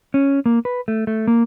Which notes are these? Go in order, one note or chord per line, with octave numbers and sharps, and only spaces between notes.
C#4
A#3
B4
A3
A3
A#3